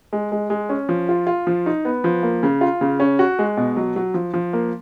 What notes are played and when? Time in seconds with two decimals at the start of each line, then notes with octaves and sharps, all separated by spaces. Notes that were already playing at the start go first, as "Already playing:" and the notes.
0.13 G#3
0.32 G#3
0.50 G#3
0.69 C#4
0.89 F3
1.09 F4
1.27 F4
1.47 F3
1.66 D#4
1.85 B3
2.04 F3
2.23 A#3
2.43 C#3
2.61 F4
2.81 C#3
3.00 C#4
3.19 F#4
3.39 G#3
3.57 B2
3.77 F#3
3.96 F#3
4.14 F3
4.34 F3
4.53 A#3